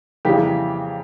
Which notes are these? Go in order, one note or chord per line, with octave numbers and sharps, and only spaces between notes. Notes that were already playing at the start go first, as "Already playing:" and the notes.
F2 C#3 E3 G3 A#3 G4